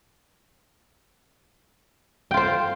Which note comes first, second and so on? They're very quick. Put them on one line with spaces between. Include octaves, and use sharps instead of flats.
G5 F4 C5